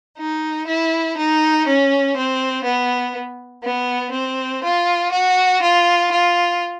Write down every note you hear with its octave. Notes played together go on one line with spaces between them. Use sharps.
D#4
E4
D#4
C#4
C4
B3
B3
C4
F4
F#4
F4
F4